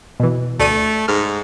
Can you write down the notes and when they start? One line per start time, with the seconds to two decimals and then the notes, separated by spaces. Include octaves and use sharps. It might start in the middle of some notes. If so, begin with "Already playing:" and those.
0.20 B2 E3
0.59 D2 A3 D5 D#7
1.08 G#2 F6